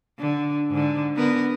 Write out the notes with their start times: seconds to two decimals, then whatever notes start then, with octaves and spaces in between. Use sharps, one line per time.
0.19 D3
0.70 G#2 D3
1.16 D3 B3 A#4